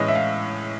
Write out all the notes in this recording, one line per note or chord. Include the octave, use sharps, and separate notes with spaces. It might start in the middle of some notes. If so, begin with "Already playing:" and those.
Already playing: A2 E3 G#3 C#4 D#5
E5
F5